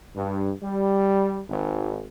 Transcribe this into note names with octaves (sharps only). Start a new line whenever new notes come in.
G2
G3
G#1